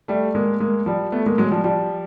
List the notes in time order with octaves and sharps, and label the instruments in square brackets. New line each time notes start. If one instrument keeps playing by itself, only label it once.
[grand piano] G3 A3
G#3 A#3
G#3 A#3
F3 G3
A3 B3
G#3 A#3
F#3 G#3
F3 G3
F3 G3